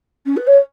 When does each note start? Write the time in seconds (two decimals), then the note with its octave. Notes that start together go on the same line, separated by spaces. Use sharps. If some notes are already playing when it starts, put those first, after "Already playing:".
0.25 C#4
0.36 B4
0.47 C#5